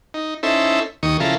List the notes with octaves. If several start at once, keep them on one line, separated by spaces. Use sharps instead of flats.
D#4
C#4 D#4 E4 A4 C5 E5
D#2 D#3 C#6 D#6
C#3 F3 E4 A4 A#4 F5